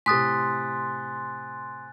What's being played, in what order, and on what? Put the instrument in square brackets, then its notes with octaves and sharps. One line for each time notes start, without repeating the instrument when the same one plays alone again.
[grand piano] A2 C3 [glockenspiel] G#5 F#6 A6 [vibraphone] C6 [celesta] D#6 B6